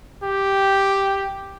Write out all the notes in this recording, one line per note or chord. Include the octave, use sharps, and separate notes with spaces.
G4